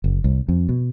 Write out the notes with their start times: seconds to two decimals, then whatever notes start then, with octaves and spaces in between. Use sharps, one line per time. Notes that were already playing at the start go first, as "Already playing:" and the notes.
0.04 F#1
0.24 C2
0.48 F2
0.69 B2